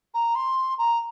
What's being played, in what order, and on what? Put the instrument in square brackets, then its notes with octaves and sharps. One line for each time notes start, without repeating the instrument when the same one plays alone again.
[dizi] A#5
C6
A#5